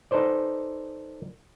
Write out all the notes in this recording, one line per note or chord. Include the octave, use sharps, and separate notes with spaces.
D#4 A4 B4 C5 D5